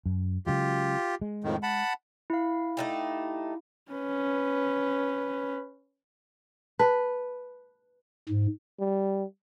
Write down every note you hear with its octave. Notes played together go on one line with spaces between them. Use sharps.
F#2
C#3 F#3 G#3 F4 G4
G#3
F2 A2 D#3
F#5 A5 B5
E4 F5
A3 D#4 G4
C#4 B4
B4 A5
G#2
G3